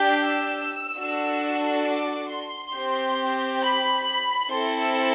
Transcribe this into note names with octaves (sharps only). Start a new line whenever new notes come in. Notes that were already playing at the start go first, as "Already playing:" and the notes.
Already playing: D4 G4
E6
D4 F#4 A4
D6
C6
C4 G4
B5
C4 E4 A4 C6
E6